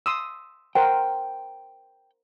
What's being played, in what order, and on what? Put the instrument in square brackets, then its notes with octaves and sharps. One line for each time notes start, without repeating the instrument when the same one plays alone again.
[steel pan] C6 D#6 E6
[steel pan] A#4 C5 F#5 [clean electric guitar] G5